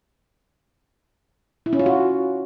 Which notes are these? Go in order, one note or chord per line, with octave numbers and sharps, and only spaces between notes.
E4
C#4
F4
F#4